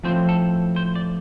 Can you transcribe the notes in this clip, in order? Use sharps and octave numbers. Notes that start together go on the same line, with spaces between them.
A2 F3 C4 C5
A4
C5
D5